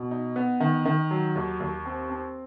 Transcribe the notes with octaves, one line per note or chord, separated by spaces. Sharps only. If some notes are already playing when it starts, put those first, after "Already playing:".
Already playing: B2
D#4
B3
D#3
D#3
F#3
D#2
D#2
C4
C4